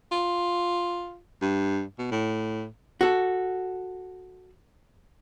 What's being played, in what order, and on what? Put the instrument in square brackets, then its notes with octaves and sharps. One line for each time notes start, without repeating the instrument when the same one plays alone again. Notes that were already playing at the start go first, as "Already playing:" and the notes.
[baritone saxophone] F4
G2
B2
A2
[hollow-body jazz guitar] F#4 A4